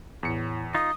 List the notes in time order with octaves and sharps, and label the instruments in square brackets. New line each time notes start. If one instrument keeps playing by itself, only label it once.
[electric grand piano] E2 C#7 [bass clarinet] A2
[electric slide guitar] D#4 F4 [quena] D#6